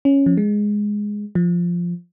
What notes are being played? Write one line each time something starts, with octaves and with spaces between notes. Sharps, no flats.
C#4
F3
G#3
F3